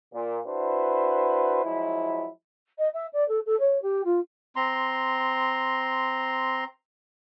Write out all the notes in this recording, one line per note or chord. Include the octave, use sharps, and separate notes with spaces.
A#2
D4 E4 F#4 B4 C5
F3 F#3 G#3 E4
D#5
E5
D5
A4
A4
C#5
G4
F4
C4 A#5 C6